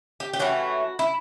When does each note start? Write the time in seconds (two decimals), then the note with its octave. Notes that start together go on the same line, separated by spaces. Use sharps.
0.20 G4
0.33 G4
0.39 E3 A3 C#4 F#4
0.99 E4